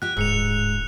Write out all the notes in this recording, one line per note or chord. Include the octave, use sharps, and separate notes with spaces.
F#4 G4 F#6
D1 G#2 E6 C#7 F7